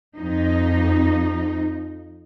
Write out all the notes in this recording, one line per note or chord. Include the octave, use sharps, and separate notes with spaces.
F2 D#4